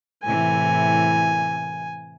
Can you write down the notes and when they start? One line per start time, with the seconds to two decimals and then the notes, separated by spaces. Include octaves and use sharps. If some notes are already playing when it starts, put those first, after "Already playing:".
0.23 A2 C3 E3 G#5